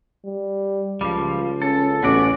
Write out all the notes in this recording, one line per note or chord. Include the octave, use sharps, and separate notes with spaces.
G3
C#2 F3 G3
C#4 A4
A1 B3 C#4 F#4 D5